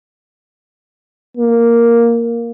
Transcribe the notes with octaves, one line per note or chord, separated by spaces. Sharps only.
A#3